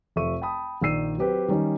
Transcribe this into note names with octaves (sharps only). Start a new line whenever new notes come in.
F1 F3 A4 E5 C#6 D#7
G5 A5 B5 D#6
A#1 D#3 D5 E6 C7 D#7
F#3 C4 G4 B4
D#3 G3 C#4 D#4